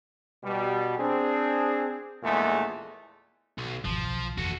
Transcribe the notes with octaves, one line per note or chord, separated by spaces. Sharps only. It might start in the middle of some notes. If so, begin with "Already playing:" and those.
B2 G3
C4 D4 G#4
A#1 E2 A#2 E3 G#3 A3
B1
G#1 E2 B2 F3
B1
F#1 E2 F3 F#4 A4